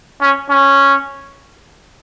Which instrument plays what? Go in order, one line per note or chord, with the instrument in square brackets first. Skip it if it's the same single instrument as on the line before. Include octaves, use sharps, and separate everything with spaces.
[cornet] C#4
C#4